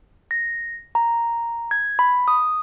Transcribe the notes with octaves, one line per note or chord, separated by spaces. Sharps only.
A#6
A#5
G#6
B5
D#6